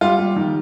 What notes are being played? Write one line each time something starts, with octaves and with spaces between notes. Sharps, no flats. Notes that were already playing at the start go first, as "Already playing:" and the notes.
G3 F4
G3
D#3